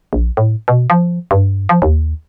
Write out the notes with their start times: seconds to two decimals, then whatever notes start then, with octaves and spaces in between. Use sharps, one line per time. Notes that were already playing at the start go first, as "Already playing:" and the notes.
0.13 A#1
0.37 A2
0.68 B2
0.90 F3
1.31 G2
1.69 F3
1.82 D#2